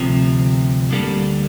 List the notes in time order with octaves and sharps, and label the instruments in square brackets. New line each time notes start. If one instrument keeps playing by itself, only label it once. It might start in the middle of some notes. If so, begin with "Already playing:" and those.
Already playing: [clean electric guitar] D2 C3 F3
D2 D3 G3 A#3